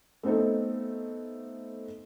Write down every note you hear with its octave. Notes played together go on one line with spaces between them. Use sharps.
A3 B3 C4 D#4 A4